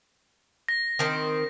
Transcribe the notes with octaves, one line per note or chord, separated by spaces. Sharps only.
A#6
D#3 C4